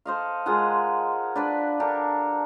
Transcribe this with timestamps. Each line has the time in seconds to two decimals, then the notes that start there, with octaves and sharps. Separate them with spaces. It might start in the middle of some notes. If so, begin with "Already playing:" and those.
0.06 A4 C5 D#5 F5
0.46 G#3 F4 A#4 F#5
1.36 D4 B4 D5
1.80 D4 G4 A4 A#4